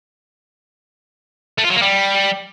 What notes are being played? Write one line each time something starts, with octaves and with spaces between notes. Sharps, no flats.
A3
F4
F#3
A#3
G3